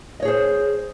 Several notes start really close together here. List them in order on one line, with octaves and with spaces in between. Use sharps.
D#5 C#5 G#4 C5